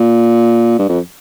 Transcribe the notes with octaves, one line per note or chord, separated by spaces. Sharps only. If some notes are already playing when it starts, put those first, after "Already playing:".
Already playing: A#2
G2
F2